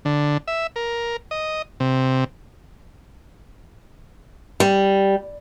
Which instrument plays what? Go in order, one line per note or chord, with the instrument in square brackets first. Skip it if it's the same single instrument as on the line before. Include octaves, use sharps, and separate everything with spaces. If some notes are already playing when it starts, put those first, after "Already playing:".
[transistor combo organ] D3
E5
A#4
D#5
C3
[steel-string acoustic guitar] G3